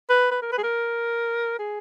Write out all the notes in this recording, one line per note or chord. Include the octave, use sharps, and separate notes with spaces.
B4
B4
A#4
B4
G#4
A#4
G#4